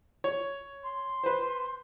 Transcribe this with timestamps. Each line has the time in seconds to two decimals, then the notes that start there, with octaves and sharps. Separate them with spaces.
0.24 C#5
0.83 C6
1.24 B4 C5